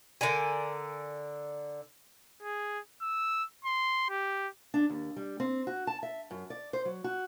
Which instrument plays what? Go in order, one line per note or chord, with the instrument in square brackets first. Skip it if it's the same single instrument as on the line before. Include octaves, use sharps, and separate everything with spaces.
[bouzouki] D3 A#4 D5 G#5
[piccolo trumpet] G#4
E6
C6
G4
[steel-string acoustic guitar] D4
D#2
G3
C4
F#4
A5
E5
F#2
D5
C5
F#3
F#4